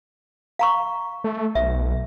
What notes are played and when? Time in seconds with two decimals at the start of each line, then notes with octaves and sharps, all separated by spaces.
0.59 F5 A#5 C#6
1.24 A3
1.55 B1 E5